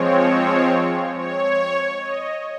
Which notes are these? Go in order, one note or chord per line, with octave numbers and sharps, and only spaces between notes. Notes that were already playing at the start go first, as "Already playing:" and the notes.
Already playing: F3 G#3 C4 C#5
C#5
D#5